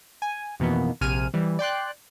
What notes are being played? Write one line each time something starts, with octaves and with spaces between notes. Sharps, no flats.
G#5
F2 B2 D#3 E3 A#3 B3
A#1 C3 G#5 F6 D#7
E3 G3
D5 G5 C6 F#6